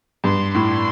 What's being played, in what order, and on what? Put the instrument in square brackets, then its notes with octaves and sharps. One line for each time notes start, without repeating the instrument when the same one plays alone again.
[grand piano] G2 [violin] C6
[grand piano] A2 [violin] C6